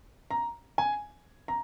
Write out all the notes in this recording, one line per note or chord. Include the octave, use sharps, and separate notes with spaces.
A#5
G#5
A#5